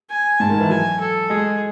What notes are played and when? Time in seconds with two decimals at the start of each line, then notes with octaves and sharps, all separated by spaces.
0.10 G#5
0.40 G#2 A5
0.49 D#3
0.61 E3
0.69 F#3 G#5
1.00 A4
1.30 G#3 G#4